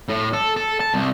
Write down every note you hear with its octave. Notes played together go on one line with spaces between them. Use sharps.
A2
A4
A4
A5
C2